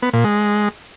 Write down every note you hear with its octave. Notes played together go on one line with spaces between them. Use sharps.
B3
A#2
G#3